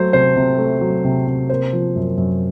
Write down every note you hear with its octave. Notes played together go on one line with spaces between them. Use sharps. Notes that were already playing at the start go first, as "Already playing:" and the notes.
Already playing: F#3 A3 C5
C3 C5
C3
A3
F#3
C3
C3
A#3 C5
F3
F#2
F#2